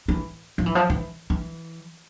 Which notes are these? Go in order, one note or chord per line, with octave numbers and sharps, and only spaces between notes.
E3
F3
E3
F3
E3
E3